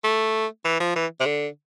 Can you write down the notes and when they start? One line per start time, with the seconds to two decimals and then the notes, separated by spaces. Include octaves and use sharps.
0.04 A3
0.65 E3
0.80 F3
0.96 E3
1.20 C3
1.26 D3